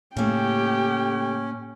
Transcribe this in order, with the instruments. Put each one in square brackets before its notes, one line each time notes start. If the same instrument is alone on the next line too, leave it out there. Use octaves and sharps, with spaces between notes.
[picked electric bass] A2 A#3 [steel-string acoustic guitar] C#3 A3 [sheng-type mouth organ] C#4 [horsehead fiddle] G4 G5